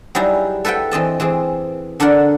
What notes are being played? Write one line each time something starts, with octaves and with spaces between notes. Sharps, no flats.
F#3 G3 D#4 E4 G#4
A4 B4 E5 F#5 G5
E3 C4 D#5 A5
E3 C4 G#4
D3 D4 A4 A#4 F#5